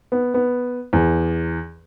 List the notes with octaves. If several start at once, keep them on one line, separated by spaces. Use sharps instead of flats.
B3
B3
E2